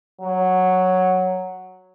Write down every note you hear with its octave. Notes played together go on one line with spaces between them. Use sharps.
F#3